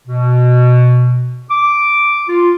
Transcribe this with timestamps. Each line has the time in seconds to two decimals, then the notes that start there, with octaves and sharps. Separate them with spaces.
0.07 B2
1.50 D6
2.28 F4